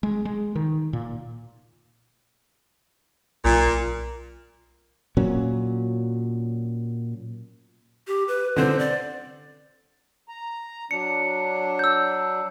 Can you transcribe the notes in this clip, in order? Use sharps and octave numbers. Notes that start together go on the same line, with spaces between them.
G#3
G#3
D#3
A#2
B1 A#2
A#2 F#3 C#4
G4
B4
D3 C4 C5
D5
A#5
F#3 D4 C#7
E6 G6